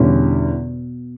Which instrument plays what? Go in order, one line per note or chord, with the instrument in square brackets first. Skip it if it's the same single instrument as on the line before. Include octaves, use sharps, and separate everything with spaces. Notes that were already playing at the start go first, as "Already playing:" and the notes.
Already playing: [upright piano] E2 D3 G3 C#4 E4 [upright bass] B2